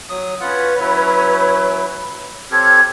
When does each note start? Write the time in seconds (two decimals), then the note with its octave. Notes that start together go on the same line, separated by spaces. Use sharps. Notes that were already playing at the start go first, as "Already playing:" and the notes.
0.10 F#3 D#6
0.40 C#4 F4 B4 C#5 F#5
0.80 F#3 E4
2.51 C4 G4 A4 C#5 F6 G#6